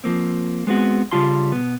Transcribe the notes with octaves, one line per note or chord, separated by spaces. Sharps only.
F3 A#3 C4
G#3 B3 C4 F#4
C#3 G3 F4 A5 C6
B2 B3